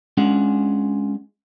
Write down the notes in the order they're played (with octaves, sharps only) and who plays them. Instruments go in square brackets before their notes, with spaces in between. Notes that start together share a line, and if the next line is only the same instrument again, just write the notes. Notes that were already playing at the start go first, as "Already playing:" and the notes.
[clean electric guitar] G#3 C#4 D4 F4 G#4 F#5